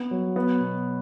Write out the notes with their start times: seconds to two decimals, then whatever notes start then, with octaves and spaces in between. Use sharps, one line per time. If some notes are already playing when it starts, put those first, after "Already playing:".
Already playing: B3
0.11 F#3
0.36 B3
0.61 B2